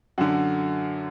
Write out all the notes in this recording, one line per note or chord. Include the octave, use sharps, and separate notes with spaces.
F#2 D3 F#4